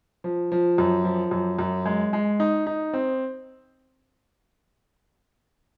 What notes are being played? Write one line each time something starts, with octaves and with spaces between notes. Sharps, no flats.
F3
F3
F#2
F3
F#2
F#2
G#3
G#3
D#4
D#4
C4